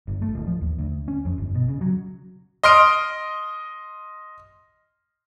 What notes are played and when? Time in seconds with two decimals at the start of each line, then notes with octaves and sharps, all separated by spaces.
0.07 G1
0.22 A3
0.35 D1
0.47 F3
0.61 D#2
0.78 D2
1.08 C#4
1.25 F2
1.38 G1
1.54 B2
1.68 C#3
1.81 F#3
2.63 D#5 C6 F6 D7